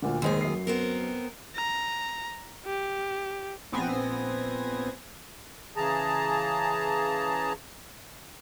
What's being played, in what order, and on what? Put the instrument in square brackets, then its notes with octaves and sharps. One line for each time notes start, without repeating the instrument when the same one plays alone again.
[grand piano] D2 A#2 D3
[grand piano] F1 G#3 C5 [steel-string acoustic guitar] D#2 D#3 G#4
[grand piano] F#2 C7
[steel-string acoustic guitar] B3 C4 A#4
[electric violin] A#5
G4
[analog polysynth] A#1 B3 C4 G#5 A#6
[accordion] C#3 E3 G#4 A5 A#5